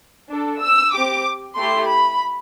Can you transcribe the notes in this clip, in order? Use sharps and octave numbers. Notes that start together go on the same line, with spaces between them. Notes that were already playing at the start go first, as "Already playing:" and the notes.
D4 A4
E6
C4 G4 D6
A3 E4 G4 C6
B5